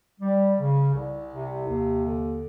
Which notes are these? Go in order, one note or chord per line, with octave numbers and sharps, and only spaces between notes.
G3
C#3
C2
C3
D#2
D3